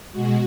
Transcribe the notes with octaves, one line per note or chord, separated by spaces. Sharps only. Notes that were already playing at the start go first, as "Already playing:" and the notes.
B2 G#3 F#4